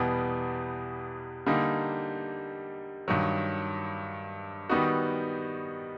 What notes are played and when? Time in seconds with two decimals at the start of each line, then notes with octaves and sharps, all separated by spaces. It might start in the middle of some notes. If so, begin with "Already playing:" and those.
Already playing: E2 B2 G3 B3
1.46 D3 G3 A#3 D#4
3.08 G2 D#3 F#3
4.69 D#3 G3 B3 D#4 F#4